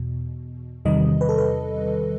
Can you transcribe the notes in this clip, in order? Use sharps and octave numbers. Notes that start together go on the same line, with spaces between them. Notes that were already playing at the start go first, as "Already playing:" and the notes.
Already playing: E2 B2
E2 C3 D#3 G3 D#5
B4
A4
B4